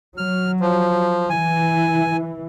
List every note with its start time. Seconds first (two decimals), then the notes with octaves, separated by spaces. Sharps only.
0.18 F#3 F6
0.60 F3
1.30 E3 G#5